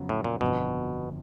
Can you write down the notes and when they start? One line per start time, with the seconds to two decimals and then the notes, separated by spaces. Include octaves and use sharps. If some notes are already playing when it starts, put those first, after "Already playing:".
Already playing: F2 C#3 F#3 B3
0.09 A2
0.24 A#2
0.41 G1 F2 B2 D3